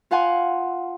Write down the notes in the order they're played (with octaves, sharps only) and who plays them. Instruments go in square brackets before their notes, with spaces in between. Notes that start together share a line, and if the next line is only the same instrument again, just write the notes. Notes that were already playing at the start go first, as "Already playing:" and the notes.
[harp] F4 F5 F#5 G#5 C6